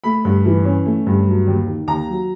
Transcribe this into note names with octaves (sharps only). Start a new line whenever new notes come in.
A3 B5
G2
E3
C#4
A3
G2
F#3
D#2
D#3
D#2 A#5
F#3